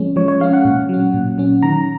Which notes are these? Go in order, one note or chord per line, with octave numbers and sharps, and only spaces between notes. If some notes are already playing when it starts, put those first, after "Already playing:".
Already playing: F3 G#3 C#4
F3 C#5
C#5
G#3 C#4 F5
F#5
A#2
F#3 C#4
A#2
F#3 C#4
D#3 A#5